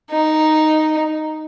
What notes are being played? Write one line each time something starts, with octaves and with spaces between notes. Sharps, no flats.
D#4